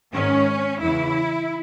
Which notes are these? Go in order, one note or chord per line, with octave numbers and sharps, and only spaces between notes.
G#2 D#3 C#4
E2 C#3 E3 E4